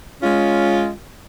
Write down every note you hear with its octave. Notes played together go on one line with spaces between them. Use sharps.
G#3 C#4 F4